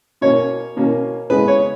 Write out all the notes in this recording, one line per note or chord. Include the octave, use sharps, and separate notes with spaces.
B2 A#3 C#4 C#5
B2 A#3 C#4
C#3 G#3 B3 B4
C#5